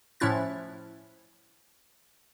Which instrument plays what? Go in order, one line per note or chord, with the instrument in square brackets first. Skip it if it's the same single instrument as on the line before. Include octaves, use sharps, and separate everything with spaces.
[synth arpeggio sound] A2 F3 C#4 E4 F#6 A6